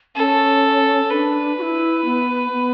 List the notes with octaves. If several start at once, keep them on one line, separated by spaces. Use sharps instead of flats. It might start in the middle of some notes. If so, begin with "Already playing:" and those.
C#4 A4
D4 B4
F#4
E4
B3
B3